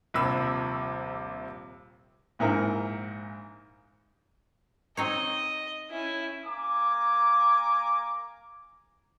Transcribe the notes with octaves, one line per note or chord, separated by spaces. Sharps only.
D#1 A#1 C3 B5 E6
A#1 G#2 E4 A#4
C4 D#4 C#5 D#5
C#4 E4
A#3 G#5 A#5 D6